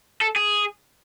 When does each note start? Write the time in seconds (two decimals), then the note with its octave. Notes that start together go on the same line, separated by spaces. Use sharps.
0.21 A4
0.36 G#4